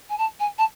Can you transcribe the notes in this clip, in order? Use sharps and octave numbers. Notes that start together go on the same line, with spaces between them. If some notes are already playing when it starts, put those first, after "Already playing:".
G#5
A5
G#5
A5